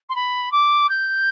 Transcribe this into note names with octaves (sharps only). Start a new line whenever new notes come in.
C6
B5
D6
G6